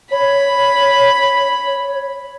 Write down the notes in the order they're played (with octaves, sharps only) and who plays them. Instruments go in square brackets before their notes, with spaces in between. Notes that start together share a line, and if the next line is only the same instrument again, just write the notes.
[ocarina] C#5 [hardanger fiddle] B5